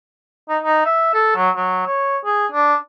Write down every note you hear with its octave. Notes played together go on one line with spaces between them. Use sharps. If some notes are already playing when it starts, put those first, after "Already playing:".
D#4
D#4
E5
A4
F#3
F#3
C#5
G#4
D4